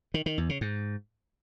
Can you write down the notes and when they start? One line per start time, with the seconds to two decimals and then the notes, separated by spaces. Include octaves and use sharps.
0.14 D#3
0.26 D#3
0.38 E2
0.49 C#3
0.61 G#2